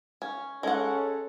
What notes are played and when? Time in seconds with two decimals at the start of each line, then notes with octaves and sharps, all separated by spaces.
0.22 C#4
0.63 G#3 C#4 A4 F#5